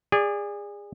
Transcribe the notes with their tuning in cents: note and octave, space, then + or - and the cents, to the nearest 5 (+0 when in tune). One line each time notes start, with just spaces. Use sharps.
G#4 -25 D5 +0